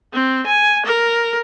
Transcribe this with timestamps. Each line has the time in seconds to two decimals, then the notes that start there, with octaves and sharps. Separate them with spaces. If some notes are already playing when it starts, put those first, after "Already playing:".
0.14 C4
0.47 G#5
0.86 A#4